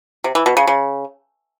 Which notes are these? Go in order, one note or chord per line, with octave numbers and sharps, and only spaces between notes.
C3
E3
B2
C#3
C#3